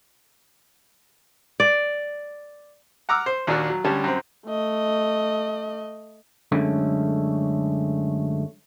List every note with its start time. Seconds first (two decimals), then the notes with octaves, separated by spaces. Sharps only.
1.60 D5
3.09 F#5 A#5 D6 E6 F6
3.26 C5
3.47 D#2 A#2 D4 F#4
3.70 F#3
3.84 D2 G3 C#4 A5
4.04 F#2 C4
4.47 A3 D#5
6.52 F#2 D3 G#3 A3 C#4